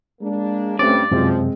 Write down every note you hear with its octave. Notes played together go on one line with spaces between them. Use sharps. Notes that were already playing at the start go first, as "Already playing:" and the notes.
G#3 A#3 D4
G2 A3 C4 C#4 D5
F#1 F#2 C3 F3 G#3 C4